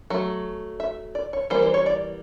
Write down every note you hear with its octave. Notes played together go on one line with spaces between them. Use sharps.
F#3 A3
E5
D5
C#5
E3 G3 A#3 C5
C5
C#5
D5